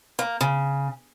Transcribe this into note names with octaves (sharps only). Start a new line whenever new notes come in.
A#3
C#3